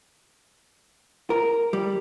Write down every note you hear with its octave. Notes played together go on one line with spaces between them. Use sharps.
A#4
G3